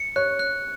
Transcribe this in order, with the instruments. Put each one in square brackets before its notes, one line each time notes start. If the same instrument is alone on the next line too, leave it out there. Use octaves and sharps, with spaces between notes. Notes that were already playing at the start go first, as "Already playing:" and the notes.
Already playing: [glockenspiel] C#7
[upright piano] C#5 [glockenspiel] F#6
[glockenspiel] F#6